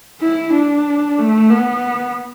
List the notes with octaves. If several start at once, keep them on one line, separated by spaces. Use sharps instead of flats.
E4
D4
A3
B3